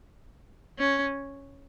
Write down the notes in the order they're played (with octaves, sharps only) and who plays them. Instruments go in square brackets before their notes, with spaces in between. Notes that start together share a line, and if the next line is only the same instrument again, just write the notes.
[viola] C#4